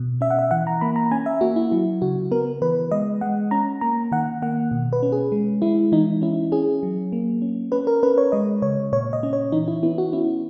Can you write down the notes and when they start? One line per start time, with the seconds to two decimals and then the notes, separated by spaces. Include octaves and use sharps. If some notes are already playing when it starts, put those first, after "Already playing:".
Already playing: B2
0.21 C#4 E5
0.31 F#5
0.39 E5
0.51 E3 F#5
0.67 A#5
0.81 A#3 B5
0.96 A#5
1.11 C#4 G#5
1.26 E5
1.41 A#3 F#4
1.56 E4
1.71 F#3 E4
2.02 C#3 F#4
2.31 B3 A#4
2.62 E3 B4
2.91 G#3 D#5
3.21 G#3 F#5
3.51 C#4 A#5
3.81 A#3 A#5
4.12 D#3 F#5
4.42 A#3 F#5
4.71 B2
4.93 B4
5.03 C#4
5.12 G#4
5.32 G#3
5.62 G#3 E4
5.92 E3 D#4
6.22 C#4 E4
6.52 C#4 G#4
6.83 F#3
7.12 A#3
7.42 C#4
7.72 C#4 B4
7.87 A#4
8.03 C#4 B4
8.18 C#5
8.32 G#3 D#5
8.62 C#3 C#5
8.92 A#2 C#5
9.13 D#5
9.23 C#4
9.33 C#5
9.52 E3 D#4
9.68 E4
9.83 B3 E4
9.98 F#4
10.13 C#4 E4